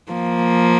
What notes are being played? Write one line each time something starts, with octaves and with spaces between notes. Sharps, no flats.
F3 A#3